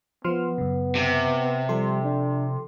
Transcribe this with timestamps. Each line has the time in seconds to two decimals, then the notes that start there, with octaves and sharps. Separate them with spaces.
0.24 F3 B3 C6 F6
0.58 F#2 C#3
0.95 C3
1.69 F3 G3 A4 C6
2.02 D4